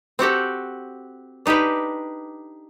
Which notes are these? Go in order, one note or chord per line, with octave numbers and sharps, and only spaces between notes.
C4 F#4 G4 A4
D4 D#4 G4 A4 B4